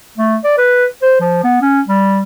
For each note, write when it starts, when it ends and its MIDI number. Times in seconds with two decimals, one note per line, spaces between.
0.18 0.37 57
0.44 0.54 74
0.58 0.86 71
1.02 1.16 72
1.21 1.43 53
1.44 1.61 59
1.62 1.81 61
1.88 2.23 55